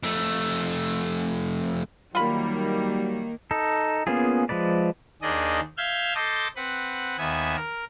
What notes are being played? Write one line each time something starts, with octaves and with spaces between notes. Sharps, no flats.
F2 A3
D#3 F#3 G3 A#3 F4 B5
D#4 A4
A#3 B3 C#4 F4 G#4
F3 G#3 B4 D5
D#2 D#3 D4 G#4 D5 D#5
E5 F5 F6 G6 G#6
A4 D#5 C6 D6 G6 A6
C4 B4 F#5
D#2 B3 E5 G#5
A#4